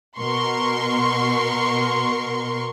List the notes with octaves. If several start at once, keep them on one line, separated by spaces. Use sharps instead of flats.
B2 A#4 C6 C#6